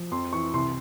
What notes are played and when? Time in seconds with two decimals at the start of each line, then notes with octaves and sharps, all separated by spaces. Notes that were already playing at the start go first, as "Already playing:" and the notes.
Already playing: F3
0.11 F2 C6
0.33 E3 C#6
0.54 C2 C6